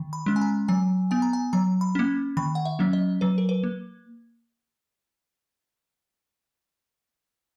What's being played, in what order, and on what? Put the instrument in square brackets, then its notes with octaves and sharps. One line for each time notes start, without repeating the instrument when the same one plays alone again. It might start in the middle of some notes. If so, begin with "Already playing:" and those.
Already playing: [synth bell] D#3
B5
G#3 C#4
G#5
A#5
F#3 G#5
B3 G#5
A#5
G#5
F#3 A#5
B5
A#3 C#4
D#3 B5
F#5
E5
F#3 A#3 C#4
D#5
F#3 B4
A#4
B4
A#3